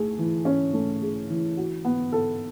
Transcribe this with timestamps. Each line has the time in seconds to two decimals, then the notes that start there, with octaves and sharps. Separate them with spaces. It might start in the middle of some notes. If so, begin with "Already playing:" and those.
Already playing: A3 G#4
0.18 E3
0.45 C#4
0.73 A3
1.02 G#4
1.30 E3
1.57 F#4
1.85 B3
2.12 A4